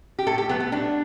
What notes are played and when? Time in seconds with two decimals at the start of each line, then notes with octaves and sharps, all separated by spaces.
0.19 G4
0.27 A2 A4
0.38 G4
0.49 F#3 A3 B3
0.60 B3
0.72 A2 D4